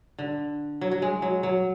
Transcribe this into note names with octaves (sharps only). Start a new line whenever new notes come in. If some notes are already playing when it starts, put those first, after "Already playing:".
D3
F#3
F#3
G#3
F#3
F#3